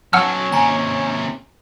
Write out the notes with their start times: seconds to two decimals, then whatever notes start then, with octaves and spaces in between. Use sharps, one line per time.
0.13 B1 F#3 C#4 F#5 A5 E6 F6
0.52 D#2 C3 G#5 A#5